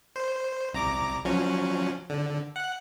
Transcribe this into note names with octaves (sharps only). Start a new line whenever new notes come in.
C5
C2 A#5 D6
F3 F#3 C#4
D3
F#5